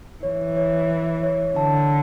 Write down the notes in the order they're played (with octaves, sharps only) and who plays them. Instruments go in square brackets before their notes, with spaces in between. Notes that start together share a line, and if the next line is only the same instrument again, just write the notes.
[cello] E3 [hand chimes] C#5
[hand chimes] C#5
C#5
C#5
[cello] D3 [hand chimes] A5